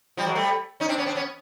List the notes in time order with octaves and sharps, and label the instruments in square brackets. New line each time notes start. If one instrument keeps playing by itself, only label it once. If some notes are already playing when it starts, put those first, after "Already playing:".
[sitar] F3 G3
F#3 G#3
G3 A3
C#4 D#4
C4 D4
B3 C#4
C4 D4
B3 C#4